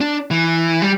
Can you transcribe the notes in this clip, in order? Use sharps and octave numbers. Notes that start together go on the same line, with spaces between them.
D4
E3
G3